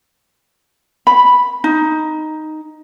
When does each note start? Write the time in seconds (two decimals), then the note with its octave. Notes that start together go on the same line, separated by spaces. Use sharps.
1.07 B5
1.64 D#4